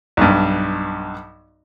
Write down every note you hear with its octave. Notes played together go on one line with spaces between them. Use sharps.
B1 G2